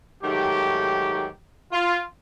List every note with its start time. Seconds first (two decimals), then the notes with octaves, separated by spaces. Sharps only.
0.22 G#2 D#3 F#3 A3 G4
1.72 F4